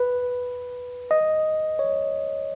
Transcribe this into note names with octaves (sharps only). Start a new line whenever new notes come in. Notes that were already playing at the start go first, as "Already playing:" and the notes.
Already playing: B4
D#5
C#5